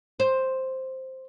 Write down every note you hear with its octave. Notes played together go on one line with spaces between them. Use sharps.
C5